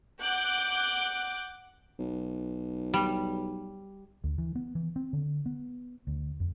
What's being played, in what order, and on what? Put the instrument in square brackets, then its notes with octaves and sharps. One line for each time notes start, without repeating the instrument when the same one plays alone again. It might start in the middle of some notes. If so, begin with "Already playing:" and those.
[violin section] F#5 D6 F#6 G6
[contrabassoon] B1
[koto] G3
[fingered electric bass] D2
E3
B3
E3
C4
D3
B3
D2
F2